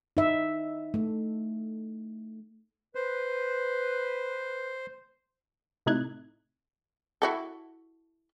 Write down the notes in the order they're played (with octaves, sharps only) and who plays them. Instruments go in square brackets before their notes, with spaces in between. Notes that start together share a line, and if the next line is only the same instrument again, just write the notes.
[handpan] D#4 E5
A3
[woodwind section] B4 [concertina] C5
[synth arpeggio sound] A2 C3 D#4 E4 F#6 G#6
[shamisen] E4 F#4 A4